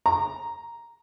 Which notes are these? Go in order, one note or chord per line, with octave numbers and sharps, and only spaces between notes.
A#5